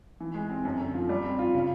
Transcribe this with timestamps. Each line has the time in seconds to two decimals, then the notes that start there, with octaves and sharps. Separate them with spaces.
0.20 E3
0.34 G#3
0.50 C4
0.65 F#2
0.79 D3
0.94 F3
1.09 G3
1.25 C4
1.39 F4
1.54 C#3